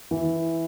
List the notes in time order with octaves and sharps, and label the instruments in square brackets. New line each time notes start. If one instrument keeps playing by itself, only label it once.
[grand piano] E3